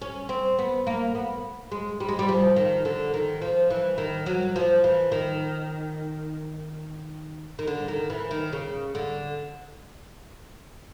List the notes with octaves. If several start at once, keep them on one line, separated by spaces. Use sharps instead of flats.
C#4
C4
B3
A#3
B3
G#3
G3
G#3
G3
F3
D#3
D3
D#3
F3
E3
D#3
F#3
F3
E3
D#3
D#3
D3
D#3
E3
D#3
C#3
D3